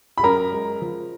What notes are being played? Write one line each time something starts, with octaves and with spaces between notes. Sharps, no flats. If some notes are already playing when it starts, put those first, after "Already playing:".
B5
F#2 A#4 A#5
G#3
F3